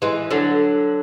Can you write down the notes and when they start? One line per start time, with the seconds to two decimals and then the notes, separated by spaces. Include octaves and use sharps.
0.02 E3 G#3
0.31 D3 F#3